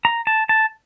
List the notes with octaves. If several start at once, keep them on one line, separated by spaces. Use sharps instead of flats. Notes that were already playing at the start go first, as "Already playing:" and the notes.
A#5
A5
A5